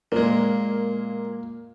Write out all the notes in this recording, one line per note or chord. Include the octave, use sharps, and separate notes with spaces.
A#2 G#3 A#3